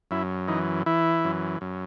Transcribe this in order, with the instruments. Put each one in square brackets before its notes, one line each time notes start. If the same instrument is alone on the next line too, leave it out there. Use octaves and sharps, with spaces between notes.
[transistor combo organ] F#2 E4
E3 D#4
E3 E4
F#2
F#2